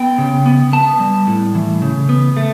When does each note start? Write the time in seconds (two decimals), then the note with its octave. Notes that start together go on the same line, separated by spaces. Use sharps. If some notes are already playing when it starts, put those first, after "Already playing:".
Already playing: B3 G5
0.18 C#3
0.46 B3
0.73 B3 A5
1.00 G3
1.27 A2
1.55 E3
1.82 C#3
2.09 B3
2.37 A3